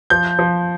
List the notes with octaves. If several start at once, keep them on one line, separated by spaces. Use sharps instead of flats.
F3 G6
F3